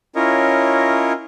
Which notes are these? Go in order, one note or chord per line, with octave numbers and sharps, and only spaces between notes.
C#4 E4 F4 A#4 C#5 D#5